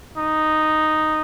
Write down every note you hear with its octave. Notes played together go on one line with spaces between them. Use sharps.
D#4